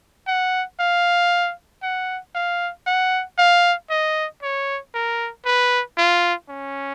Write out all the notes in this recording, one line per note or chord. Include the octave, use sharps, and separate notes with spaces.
F#5
F5
F#5
F5
F#5
F5
D#5
C#5
A#4
B4
F4
C#4